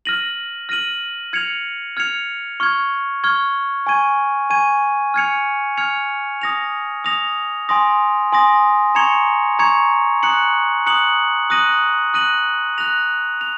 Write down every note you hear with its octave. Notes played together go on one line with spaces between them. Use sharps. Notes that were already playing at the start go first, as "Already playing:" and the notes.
F6 A#6 D#7 F#7
F6 A#6 D#7 F#7
F6 G#6 C#7 F7
F6 G#6 C#7 F7
C#6 F6 G#6
C#6 F6 G#6
G#5 C#6 G#6 D#7
G#5 C#6 G#6 D#7
F6 G#6 C#7 F7
F6 G#6 C#7 F7
D#6 A#6 F7
D#6 A#6 F7
G#5 C6 D#6 A#6
G#5 C6 D#6 A#6
A#5 C#6 G#6 C#7 F7
A#5 C#6 G#6 C#7 F7
A#5 D#6 F#6 C#7 F#7
A#5 D#6 F#6 C#7 F#7
D#6 F#6 A#6 D#7 F#7
D#6 F#6 A#6 D#7 F#7
F#6 A#6 F7
F7